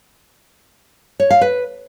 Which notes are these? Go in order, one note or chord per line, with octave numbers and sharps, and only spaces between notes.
C#5
F5
B4